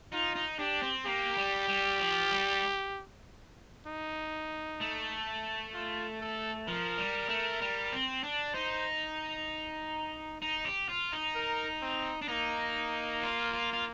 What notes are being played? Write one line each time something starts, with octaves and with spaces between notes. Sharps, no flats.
D#4 F4
D#4
D4 G4
C4
A#3 G4
G3
G3
F3
G3
D#4
A3
F4
A4
F3 A#4
G3
A3
G3
C4
D4
D#4 C5
D#4
G4
F4
D#4
A#4
C4
D4
A#3 D#4
F4
F4
F4